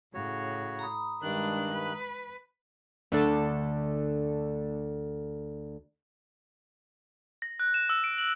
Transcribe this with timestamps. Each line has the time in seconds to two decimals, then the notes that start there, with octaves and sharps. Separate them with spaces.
0.14 A2 C#3 F#4 C#5
0.79 A#5 B5 D#6
1.22 G2 D#3 G#3 D4 F#6
1.73 B4
3.12 D2 A3 D4 A4
7.42 A#6
7.60 F#6
7.74 E7
7.89 E6
8.04 D7
8.18 F#7